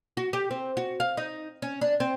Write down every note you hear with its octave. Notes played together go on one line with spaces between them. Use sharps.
F#4
G4
C4
F#4
F5
D#4
C#4
D4
C4